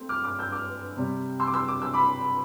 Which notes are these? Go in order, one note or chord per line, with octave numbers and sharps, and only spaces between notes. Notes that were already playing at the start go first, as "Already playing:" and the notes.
Already playing: A3 C4
D6 F6
D6 F6
E6 G6
D6 F6
C3 G3 C4
C6 E6
D6
C6 E6
D6
E6
B5 D6